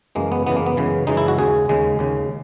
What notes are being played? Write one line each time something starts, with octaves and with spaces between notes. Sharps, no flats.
F#2 C#3 E3 G#3 A#3
B3
F#2 C#3 E3 G#3 B3
A#3
B3
F#2 C#3 E3 G#3
F#2 C#3 E3 G#3 D#4
E4
F#4
D#2 C#3 G#3 G#4
D#2 C#3 G#3
D#2 C#3 G#3